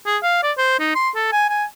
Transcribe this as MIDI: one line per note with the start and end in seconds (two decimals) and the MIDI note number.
0.06 0.18 68
0.23 0.40 77
0.43 0.52 74
0.58 0.77 72
0.80 0.94 63
0.95 1.10 84
1.16 1.30 69
1.32 1.49 80
1.49 1.65 80